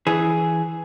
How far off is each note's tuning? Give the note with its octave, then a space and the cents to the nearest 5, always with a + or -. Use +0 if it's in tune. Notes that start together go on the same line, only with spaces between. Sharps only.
E3 +0 G#4 +5